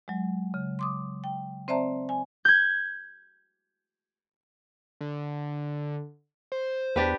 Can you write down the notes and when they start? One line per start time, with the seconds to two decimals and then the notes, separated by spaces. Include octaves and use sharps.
0.08 F#3 G#3
0.54 C#3
0.79 C6 D6 D#6
1.24 G5
1.68 C4 C5 D5 E5 A5 A#5
2.09 G#5
2.45 G6 G#6
5.01 D3
6.52 C5
6.96 E2 D4 G4 B4